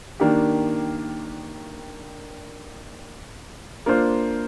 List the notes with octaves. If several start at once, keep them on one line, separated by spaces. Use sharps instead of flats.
D#3 A#3 D4 G4
A#3 D4 F4 C5